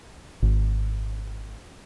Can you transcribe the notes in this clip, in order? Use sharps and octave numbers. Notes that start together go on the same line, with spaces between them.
G#1